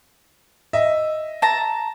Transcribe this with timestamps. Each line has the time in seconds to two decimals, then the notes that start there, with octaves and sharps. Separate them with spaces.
0.73 D#5 E5
1.42 A5 A#5